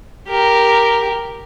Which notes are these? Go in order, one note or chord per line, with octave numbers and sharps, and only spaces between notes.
G4 A#4